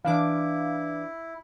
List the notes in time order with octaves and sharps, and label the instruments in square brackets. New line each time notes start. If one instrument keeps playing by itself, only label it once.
[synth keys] E3 D4 D6 [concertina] E4 [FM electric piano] F5